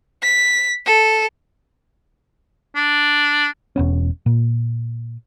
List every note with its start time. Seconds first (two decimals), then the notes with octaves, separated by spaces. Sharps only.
0.23 B6
0.86 A4
2.76 D4
3.76 E1 B3 C#4
4.26 A#2